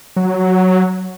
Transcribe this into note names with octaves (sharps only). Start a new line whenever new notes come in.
F#3